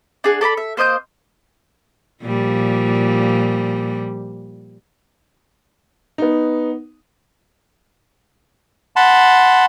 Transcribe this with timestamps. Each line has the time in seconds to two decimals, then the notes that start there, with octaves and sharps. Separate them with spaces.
0.24 D4 G#4 F#5
0.41 A4 D5 A#5 B5
0.57 E5
0.77 A#3 C5 D#5 G6
2.22 A#2 F3 G3
6.18 B3 D#4
8.96 F#5 A5 B5 C6